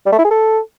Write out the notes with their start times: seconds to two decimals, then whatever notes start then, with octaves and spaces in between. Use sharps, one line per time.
0.06 G3
0.12 A3
0.19 E4
0.25 G#4
0.31 A4